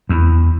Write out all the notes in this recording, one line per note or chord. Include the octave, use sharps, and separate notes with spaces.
E2